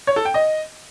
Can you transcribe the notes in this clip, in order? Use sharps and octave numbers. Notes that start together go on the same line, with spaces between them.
C#5
A4
G5
D#5